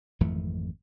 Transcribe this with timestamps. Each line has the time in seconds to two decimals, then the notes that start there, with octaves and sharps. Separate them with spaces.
0.20 G#1 F2 E3 A3